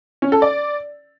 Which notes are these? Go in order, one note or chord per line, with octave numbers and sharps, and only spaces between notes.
C#4
A4
D5